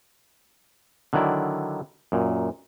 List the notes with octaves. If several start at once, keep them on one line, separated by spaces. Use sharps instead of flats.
D3 D#3 F#3 E4 D5
F#2 A#2